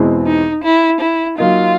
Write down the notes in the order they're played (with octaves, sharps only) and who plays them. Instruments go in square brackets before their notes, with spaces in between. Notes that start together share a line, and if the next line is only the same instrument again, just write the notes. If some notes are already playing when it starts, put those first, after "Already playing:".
Already playing: [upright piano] E2 B2 G#3 C4 E4
[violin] D#4
E4
E4
[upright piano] F#3 A#3 D#4 [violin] F4